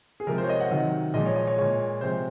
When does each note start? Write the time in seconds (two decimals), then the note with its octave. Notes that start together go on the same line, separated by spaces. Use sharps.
0.20 G#4
0.27 C3 F3 G#3 A#4
0.38 C5
0.44 C#5
0.49 D#5
0.60 F#5
0.71 C3 D#3 F#3
1.14 A#2 F3 G#3 D#5
1.26 C#5
1.36 D#5
1.47 C#5
1.58 A#2 G#3 C#5
2.01 C3 F3 G#3 C5